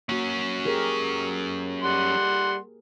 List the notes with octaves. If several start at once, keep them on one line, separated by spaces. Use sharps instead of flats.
F#3 A#3 C#4 F#4
G4 G#4 A#4
G3 F#5 C6